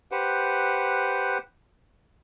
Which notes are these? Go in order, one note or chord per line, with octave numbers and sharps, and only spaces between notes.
G4 B4 C5 F#5